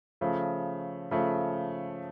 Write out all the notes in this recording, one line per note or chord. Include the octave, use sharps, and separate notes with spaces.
C#3 F3 A3
C#3 F3 A3